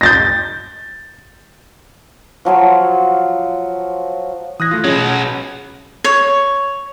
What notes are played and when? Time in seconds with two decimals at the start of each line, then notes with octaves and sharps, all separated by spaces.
0.01 G6 A6 A#6
2.45 F3 F#3 F4 C#5
4.60 E3 D#6 F#6 G#6 A#6
4.71 A3 F4
4.85 B2 F#3 C#4 G#4
6.04 C#5